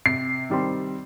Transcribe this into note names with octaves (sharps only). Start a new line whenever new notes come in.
C3 C7
D#3 G3 C4